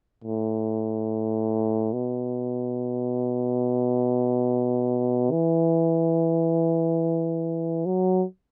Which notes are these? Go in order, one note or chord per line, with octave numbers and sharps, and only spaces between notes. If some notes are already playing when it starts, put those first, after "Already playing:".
A2
B2
E3
F#3